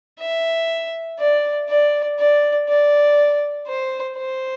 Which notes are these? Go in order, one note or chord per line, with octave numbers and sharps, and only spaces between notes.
E5
D5
D5
D5
D5
C5
C5